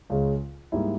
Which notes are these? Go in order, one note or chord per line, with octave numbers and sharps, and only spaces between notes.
C#2 C#3 G#3
G#2 G3 A#3 E4